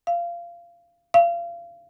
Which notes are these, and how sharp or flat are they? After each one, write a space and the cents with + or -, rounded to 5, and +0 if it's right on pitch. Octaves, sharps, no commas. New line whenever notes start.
F5 -20
F5 -30